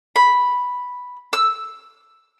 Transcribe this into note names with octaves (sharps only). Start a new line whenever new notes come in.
B5
E6